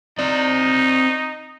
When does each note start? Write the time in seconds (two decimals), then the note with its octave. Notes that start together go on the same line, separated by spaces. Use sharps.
0.19 C4 D#4 D5